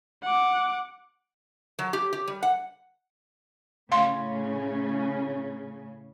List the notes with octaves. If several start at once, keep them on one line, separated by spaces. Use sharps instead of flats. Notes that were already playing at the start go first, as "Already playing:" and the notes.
F#5 D6
F#3
G4
G4
G3
F#5
A2 C#3 C#4 F5 C6